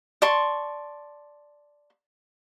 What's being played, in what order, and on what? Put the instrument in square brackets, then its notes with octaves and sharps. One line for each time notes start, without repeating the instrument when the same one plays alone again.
[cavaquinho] D5 A5 C6 C#6